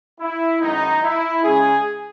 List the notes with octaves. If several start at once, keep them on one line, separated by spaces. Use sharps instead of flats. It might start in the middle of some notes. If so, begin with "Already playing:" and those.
E4
F#2 D#3 G#3 B3 D#4
E4
C#3 G#3 C#4 G#4